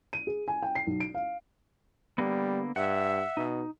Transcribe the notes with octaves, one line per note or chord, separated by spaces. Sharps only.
D#7
G#4
G#5
G5
C7
B1
D7
F5
D3 G3 A#3 B3
G2 E5 F#5
B2 D#4